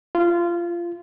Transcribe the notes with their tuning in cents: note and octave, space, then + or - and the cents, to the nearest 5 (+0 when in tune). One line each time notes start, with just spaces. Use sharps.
F4 -20